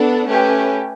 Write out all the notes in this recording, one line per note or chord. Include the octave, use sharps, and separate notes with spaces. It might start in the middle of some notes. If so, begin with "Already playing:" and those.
Already playing: B3 D4 A4
A3 C#4 G4 B4